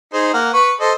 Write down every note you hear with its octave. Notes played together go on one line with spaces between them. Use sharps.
D#4 G#4 C5
A#3 F#5
B4 C#6
A4 C5 D#5